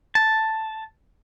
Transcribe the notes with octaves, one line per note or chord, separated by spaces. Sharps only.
A5